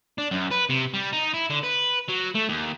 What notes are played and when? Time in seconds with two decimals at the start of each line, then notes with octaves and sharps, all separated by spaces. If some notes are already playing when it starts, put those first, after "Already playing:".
0.18 D4
0.31 F#2
0.51 B4
0.70 C3
0.94 G3
1.13 D#4
1.34 E4
1.50 D3
1.64 B4
2.09 F#3
2.35 A3
2.49 D#2